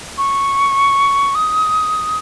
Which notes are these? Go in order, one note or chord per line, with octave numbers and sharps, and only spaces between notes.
C#6
D#6